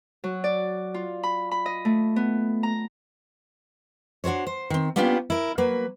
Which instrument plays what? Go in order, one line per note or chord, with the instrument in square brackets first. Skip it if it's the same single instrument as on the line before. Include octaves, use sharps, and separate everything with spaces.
[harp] F#3
D5
F4
B5
B5
D#5
A3
B3
A#5
[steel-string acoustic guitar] D4 F#4 A4 C5 C#5
C5
D#3 C4
A#3 B3 C#4 D4 F4 G4
E4 A#4
F#3 A#3 B4